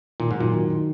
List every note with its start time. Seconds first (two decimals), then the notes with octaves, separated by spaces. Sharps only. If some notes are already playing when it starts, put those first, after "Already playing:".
0.20 A#2 D#3
0.31 G#2
0.36 A#2 F#3
0.53 D#3
0.70 D#3